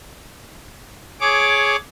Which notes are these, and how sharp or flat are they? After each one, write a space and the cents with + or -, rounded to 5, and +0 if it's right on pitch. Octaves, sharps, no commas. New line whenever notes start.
G#4 +15 C#5 +0 D6 +0